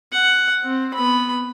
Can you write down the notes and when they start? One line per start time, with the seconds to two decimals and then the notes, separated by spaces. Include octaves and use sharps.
0.12 F#5
0.63 C4
0.94 B3 B5